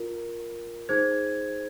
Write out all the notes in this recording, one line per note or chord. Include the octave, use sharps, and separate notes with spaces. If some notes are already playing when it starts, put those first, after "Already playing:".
Already playing: F4 A#4
D#4 G#4 C5 G#6